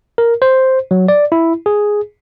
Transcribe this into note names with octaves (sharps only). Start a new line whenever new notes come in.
A#4
C5
F#3
D5
E4
G#4